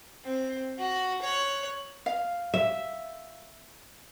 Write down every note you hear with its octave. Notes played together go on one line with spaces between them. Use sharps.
C4
F#4
C#5 F#6
F5
E5